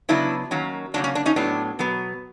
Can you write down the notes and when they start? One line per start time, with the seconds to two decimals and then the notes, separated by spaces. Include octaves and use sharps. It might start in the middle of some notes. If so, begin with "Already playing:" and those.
0.09 C#3 F#3 B3 D4 E4
0.51 D#3 F#3 A#3 C#4
0.94 C#3 F#3 A#3 C#4 D4
1.04 C#4
1.15 D4
1.26 C#4 D#4
1.36 A2 F#3 B3 D4
1.79 B2 F#3 B3